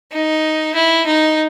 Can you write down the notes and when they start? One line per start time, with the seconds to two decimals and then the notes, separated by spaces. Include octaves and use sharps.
0.12 D#4
0.75 E4
1.06 D#4